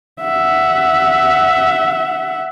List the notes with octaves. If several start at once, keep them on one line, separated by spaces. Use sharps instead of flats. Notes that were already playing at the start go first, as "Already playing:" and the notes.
E5 F#5